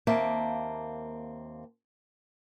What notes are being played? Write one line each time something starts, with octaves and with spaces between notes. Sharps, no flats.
D#2 A#3 C4 E5 F5 A5